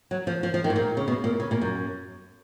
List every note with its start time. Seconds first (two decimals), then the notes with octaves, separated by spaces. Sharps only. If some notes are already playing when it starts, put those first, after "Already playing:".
0.11 F#3
0.27 F3
0.43 F3
0.54 F3
0.64 D#3
0.70 G#2
0.76 A#2
0.97 C#3
1.08 B2
1.24 A#2
1.40 C#3
1.51 A#2
1.62 F#2